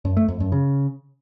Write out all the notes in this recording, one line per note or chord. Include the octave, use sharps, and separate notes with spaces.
F#2
A3
F2
F#2
C#3